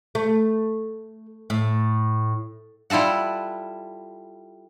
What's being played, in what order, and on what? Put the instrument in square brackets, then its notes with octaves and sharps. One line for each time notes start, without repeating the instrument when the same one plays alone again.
[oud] A3
A2
[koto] G3 E4 F4 A4 F#5